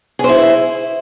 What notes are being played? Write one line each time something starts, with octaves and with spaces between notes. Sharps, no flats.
E4 G#4 C5